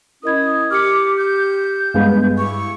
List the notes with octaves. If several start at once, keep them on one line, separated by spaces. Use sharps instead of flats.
C#4 E4 A#4 D#5 D#6 G#6
G4 D6 F6 C#7
G6
G2 G#3 B3 F5
E4 G4 C#6